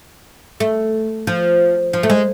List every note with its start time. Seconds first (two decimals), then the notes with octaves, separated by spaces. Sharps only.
0.60 A3
1.27 F3
1.93 F3
2.03 A3
2.10 G#3